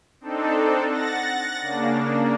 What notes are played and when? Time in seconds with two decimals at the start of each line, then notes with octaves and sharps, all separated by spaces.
0.21 C4 D4 D#4 A4
0.89 F#5 A6 A#6
1.61 C#3 A#3 D4